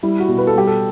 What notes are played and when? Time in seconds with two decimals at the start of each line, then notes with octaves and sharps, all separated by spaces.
0.03 G3 E4
0.20 F#4
0.28 B2
0.38 B4
0.47 A4
0.55 G3 G4
0.67 A4